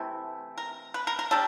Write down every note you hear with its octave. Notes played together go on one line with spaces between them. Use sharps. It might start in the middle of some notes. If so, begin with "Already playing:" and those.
Already playing: C3 E3 A3
A#4
B4
A#4
A#4
G3 D4 A4